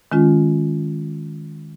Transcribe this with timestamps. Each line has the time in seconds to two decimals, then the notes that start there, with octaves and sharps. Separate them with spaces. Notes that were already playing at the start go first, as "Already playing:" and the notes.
0.12 D#3 G#3 C#4 F4